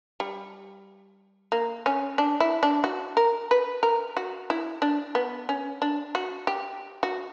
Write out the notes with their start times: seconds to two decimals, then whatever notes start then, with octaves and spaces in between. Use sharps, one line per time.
0.20 G3
1.52 A#3
1.86 C#4
2.18 D4
2.40 E4
2.63 D4
2.84 F#4
3.17 A#4
3.51 B4
3.83 A#4
4.17 F#4
4.50 E4
4.82 D4
5.15 B3
5.49 C#4
5.82 D4
6.15 F#4
6.47 G4
7.03 F#4